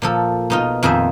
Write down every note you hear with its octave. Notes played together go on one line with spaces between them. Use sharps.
A#2 F3 A4
B2 D#4 F4
F2 A#2 D#3 G#4 C5 E5